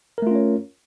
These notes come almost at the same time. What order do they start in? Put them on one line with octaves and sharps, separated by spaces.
A#4 A3 F4 C#4 C#5